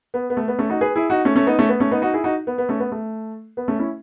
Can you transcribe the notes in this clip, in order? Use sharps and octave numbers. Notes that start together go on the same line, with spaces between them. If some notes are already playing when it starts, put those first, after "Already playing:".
B3
B3
A3
B3
A3 C#4
D#4 F#4
G#4 B4
E4 G#4
D#4 F#4
A3 C#4
A3 C#4
B3 D#4
A3 C#4
B3
A3 C#4
B3 D#4
D#4 F#4
E4 G#4
D#4 F#4
B3
B3
A3 C#4
B3
A3
B3
A3 C#4
C#4 E4